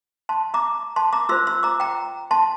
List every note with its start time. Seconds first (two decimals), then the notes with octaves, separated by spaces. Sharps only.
0.29 A5 C6
0.54 A#5 D6
0.96 A5 C6
1.13 A#5 D6
1.29 F4 C5 C6 E6
1.47 C6 E6
1.63 A#5 D6
1.80 G5 A#5
2.31 A5 C6